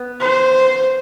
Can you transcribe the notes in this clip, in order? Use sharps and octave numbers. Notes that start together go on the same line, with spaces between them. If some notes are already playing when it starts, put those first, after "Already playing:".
Already playing: B3
C5